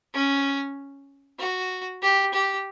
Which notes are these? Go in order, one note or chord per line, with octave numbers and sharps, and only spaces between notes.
C#4
F#4
G4
G4